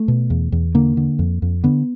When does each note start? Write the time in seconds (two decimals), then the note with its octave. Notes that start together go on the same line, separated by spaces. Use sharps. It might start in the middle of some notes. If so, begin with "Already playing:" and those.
Already playing: A3
0.08 B2
0.30 E2
0.52 E2
0.75 D3 A#3
0.97 D3
1.19 F2
1.42 F2
1.64 D3 B3